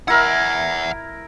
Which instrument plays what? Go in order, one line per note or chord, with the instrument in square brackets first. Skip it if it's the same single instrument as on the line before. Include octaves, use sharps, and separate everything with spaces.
[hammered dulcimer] E4 A#4 [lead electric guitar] E5 F#5